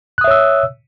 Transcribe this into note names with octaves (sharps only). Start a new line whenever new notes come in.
C#5 E5 D#6 E6 F#6